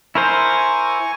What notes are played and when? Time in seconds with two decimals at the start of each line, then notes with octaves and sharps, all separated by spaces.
0.15 E4 A#4 C5 G#5 C#6